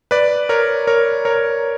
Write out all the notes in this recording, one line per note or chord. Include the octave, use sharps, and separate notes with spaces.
B4 D5
A#4 C#5
A#4 C#5
A#4 C#5